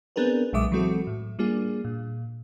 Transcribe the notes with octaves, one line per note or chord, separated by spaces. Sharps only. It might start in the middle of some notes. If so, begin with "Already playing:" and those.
B3 C4 D4 G#4 A#4 B4
B1 A#2 F#3 G#3 E5 D6
E3 F#3 G#3 C4 F#4 A4
A2
G3 A#3 D4 F4 G#4
A#2